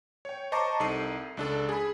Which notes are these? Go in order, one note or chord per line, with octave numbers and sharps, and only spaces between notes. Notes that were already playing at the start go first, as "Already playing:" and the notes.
C#5 G5
C5 D#5 A5 A#5 C#6 D6
C2 D#4 A4 C7 D#7
C#2 D4 A4
G#4 B5